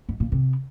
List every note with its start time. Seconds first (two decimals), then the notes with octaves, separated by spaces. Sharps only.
0.09 G#2
0.20 A#2
0.32 C3